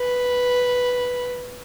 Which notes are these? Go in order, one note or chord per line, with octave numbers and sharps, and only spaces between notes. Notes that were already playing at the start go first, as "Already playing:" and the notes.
Already playing: B4